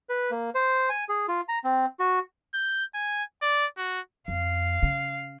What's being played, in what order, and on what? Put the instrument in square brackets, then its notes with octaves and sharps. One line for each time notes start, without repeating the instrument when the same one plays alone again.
[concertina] B4
A#3
C5
G#5
G#4
F4
A#5
C4
F#4
[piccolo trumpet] G6
G#5
D5
F#4
[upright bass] F2 [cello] F5
[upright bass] C#3